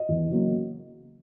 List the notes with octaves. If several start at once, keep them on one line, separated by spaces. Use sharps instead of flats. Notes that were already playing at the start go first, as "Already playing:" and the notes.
Already playing: D#5
E2
C#3 F#3 A#3